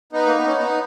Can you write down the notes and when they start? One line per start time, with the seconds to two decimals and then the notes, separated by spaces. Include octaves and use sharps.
0.13 B3 D#4
0.26 A#3
0.36 B3
0.46 C#4
0.56 B3 D#4